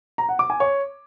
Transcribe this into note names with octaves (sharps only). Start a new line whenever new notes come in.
A#5
F#5
D6
G#5
C#5